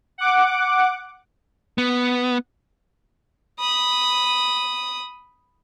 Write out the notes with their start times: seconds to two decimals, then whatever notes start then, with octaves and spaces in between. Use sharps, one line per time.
0.18 F#5 D6
1.78 B3
3.60 B5 D#6